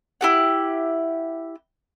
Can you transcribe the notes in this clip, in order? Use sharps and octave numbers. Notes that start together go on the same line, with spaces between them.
E4 G4 F#5